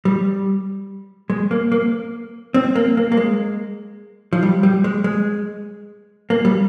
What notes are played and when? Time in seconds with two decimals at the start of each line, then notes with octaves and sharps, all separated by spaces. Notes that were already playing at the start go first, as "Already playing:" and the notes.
0.05 G3
1.30 G#3
1.51 A#3
1.72 A#3
2.54 C4
2.75 A#3
2.97 A#3
3.12 A#3
3.17 G#3
4.33 F3
4.43 G3
4.63 G3
4.84 G#3
5.04 G#3
6.30 A#3
6.45 G3